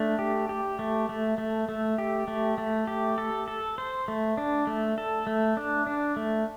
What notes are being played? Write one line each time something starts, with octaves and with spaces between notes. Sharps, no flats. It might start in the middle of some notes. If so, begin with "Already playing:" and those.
Already playing: A3 D4
G4
G4
A3
A3
A3
A3
G4
A3
A3
G4
A4
A4
C5
A3
D4
A3
A4
A3
D4
D4
A3